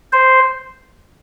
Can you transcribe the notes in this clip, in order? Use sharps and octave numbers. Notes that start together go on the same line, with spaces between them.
C5